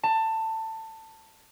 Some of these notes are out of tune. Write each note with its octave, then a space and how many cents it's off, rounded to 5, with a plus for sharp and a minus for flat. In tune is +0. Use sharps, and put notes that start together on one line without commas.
A5 +20